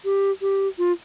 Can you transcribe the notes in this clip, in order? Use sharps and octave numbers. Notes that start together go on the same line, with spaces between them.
G4
G4
F4